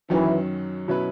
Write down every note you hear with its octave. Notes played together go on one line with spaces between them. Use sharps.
F#2 D#3 E3 F#3 C#4
B2 F#3 C#4 E4 B4